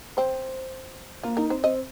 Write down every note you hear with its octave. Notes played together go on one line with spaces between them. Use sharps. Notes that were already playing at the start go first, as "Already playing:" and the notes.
C4 C5
A#3 F4
D#4 A#4
C4 C5
C4 D#5